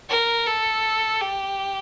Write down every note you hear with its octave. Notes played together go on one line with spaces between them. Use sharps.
A#4
A4
G4